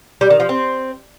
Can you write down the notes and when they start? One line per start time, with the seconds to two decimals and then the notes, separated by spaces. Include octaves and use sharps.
0.21 G3
0.30 D#3
0.40 F3
0.49 C4